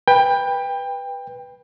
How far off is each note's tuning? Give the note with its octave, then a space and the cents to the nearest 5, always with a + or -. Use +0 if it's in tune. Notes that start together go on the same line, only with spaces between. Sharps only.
B4 -5 G5 +20